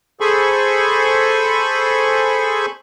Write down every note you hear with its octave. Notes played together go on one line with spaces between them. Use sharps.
G#4 A4 C5 G#5 B5 C#6